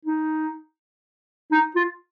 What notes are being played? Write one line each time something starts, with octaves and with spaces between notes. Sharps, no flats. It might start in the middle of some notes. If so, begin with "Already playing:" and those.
D#4
D#4
F4